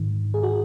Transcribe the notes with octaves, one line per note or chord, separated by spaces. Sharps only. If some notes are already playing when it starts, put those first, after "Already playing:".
Already playing: G#2 D#3
G#4
F#4